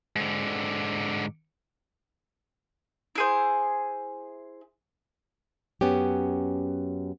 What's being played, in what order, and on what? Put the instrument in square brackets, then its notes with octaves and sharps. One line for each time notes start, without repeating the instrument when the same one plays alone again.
[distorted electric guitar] G#2 D3
[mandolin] E4 G#4 C5
[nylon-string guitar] F#2 B3 C#4 G4